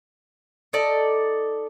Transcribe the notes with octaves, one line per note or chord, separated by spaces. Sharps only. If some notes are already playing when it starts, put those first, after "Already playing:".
D#4 A4 D5